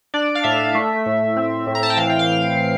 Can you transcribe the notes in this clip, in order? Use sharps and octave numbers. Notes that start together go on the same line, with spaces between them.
D4 D5
F5
A2 E5
A3
A2
C4
A2
A#5
A5
G5
E3 F5
G5
F5